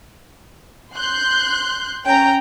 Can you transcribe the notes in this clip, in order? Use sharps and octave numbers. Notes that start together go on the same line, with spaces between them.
C6 F#6 G6
C#4 G5 A#5